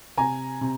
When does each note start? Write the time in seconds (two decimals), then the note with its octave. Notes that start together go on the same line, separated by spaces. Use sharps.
0.17 C3 G#5 A#5
0.61 C3